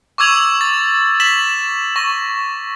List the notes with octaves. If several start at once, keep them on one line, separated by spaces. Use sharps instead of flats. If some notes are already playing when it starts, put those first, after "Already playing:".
C#6 D6 E6 G#6 F7 F#7
A6
B6 E7 F#7
C#6 A#6